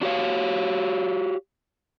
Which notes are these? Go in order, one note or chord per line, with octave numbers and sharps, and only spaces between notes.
D4 F#4 G4 C#5 F5